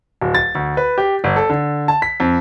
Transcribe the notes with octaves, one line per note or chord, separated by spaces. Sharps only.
D1
A6
D2
B4
G4
G1
A4
D3
A5
B6
F2